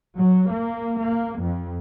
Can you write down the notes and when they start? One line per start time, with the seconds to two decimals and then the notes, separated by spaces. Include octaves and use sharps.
0.18 F#3
0.50 A#3
1.00 A#3
1.40 F2